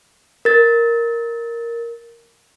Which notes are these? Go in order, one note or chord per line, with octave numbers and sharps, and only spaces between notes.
A#4 A6